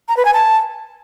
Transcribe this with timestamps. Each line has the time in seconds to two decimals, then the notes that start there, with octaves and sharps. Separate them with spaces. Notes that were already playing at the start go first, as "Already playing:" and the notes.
0.08 A#5
0.17 B4
0.25 G#5
0.34 A5